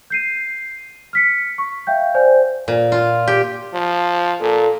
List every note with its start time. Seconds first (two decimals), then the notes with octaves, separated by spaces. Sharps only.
0.10 G6 C7 D#7
1.13 F6 B6 C#7
1.58 C#6
1.87 E5 F5 G5 G6
2.14 C5 D5 G#5 G6
2.68 A#2
2.92 F4
3.28 G4
3.73 F3
4.41 A#2 A4